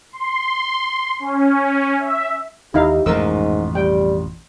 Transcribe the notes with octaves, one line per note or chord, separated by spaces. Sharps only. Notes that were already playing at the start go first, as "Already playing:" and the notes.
C6
C#4
E5
D#2 D#4 E4 G4 F5
A1 F2 G#2 B2 A#4 E6
G3 G5